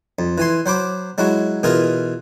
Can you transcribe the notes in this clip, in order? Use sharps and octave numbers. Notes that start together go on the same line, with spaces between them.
F2
E3 G#5 C6
F#3 C5 B5 D6
F#3 G#3 E4 F#4
B2 E3 F4 G#4 A#4